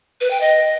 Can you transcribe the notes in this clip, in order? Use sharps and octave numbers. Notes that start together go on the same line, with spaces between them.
B4
G5
D#5